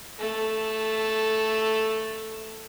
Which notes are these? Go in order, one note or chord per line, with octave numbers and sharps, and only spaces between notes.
A3 A4